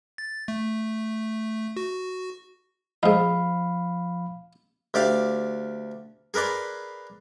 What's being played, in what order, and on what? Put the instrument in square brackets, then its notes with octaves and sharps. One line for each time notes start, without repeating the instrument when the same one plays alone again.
[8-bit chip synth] A6
A3
F#4
[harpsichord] G#2 D#4 [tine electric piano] F3 F5 B5
[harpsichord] D2 G4 D5 F5
G#4 A#4 B4 D5 C6